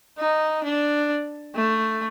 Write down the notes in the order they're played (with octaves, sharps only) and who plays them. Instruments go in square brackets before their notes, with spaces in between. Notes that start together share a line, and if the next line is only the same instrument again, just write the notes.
[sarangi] D#4
D4
A3